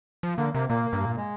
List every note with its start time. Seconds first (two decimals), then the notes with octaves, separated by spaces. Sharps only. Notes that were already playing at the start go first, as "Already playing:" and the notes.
0.23 F3
0.38 D3 A#3
0.54 C3 A#3
0.69 A#2 A#3
0.93 G2
1.06 A#2
1.17 G#3